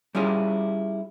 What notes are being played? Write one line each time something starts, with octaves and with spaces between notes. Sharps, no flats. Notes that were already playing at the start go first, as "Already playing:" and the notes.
G3 C#4 E4 F4 G#4